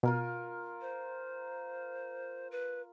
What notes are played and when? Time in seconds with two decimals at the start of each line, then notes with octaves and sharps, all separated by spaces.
0.03 B2 F4 A#4 G#5
0.81 C5
2.51 B4